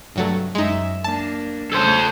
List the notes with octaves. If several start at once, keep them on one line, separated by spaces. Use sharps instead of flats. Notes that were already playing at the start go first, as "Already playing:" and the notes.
G2 C3 F#3 A3
F#2 G#3 D#4 E5
A#3 D4 A5
C#3 A3 A4 C5